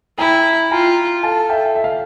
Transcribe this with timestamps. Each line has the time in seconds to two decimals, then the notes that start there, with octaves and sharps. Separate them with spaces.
0.18 E4 G5 A#5
0.71 F4 G5 A#5
1.23 A4 F5 A5
1.50 E5 G5
1.76 E5
1.84 F5